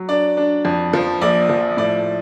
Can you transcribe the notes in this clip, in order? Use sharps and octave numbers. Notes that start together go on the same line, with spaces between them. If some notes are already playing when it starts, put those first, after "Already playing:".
Already playing: F#3
D4 D5
D4
F2
F3
A#1 D5
F3
A2 D5